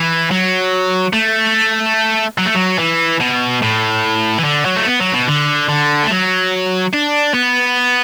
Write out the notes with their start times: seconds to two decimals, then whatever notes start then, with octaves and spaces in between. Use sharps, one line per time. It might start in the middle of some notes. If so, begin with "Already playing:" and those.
Already playing: E3
0.31 F#3
1.13 A3
2.38 F#3
2.46 A3
2.55 F#3
2.79 E3
3.21 B2
3.62 A2
4.39 E3
4.44 D3
4.65 F#3
4.76 A3
4.86 B3
5.00 F#3
5.13 B2
5.28 D3
5.69 D3
6.03 A3
6.10 F#3
6.93 D4
7.34 B3